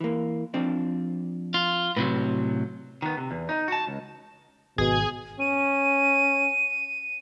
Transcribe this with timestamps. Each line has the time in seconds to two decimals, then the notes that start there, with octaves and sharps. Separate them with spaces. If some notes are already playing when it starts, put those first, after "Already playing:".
0.01 E3 A#3
0.54 F3 C4 D4
1.54 F4
1.97 A2 C3 F#3 B4
3.02 D#3 B3
3.17 C3
3.31 E2
3.49 D#4
3.68 F#4 A5
3.87 C#2
4.78 G#1 B2 G#4
5.40 C#4 D#7